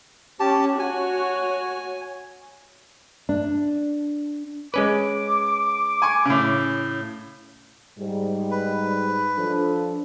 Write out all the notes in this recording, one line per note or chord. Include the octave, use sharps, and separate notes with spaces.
C#4 G4 A5
F#4 C#5 G#5
D4
G#3 C#4 B4 D6
G#5 C#6
A2 C#3
G#2 G3
B4
F3 D4 A4